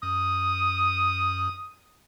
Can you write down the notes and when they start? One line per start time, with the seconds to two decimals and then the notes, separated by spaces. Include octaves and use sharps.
0.03 F#2 D#6